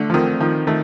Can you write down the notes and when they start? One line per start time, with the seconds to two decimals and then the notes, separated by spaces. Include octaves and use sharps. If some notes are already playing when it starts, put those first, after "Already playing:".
Already playing: D3 A3
0.10 F3
0.14 D#3 C4
0.40 D#3 F3
0.67 D#3 A3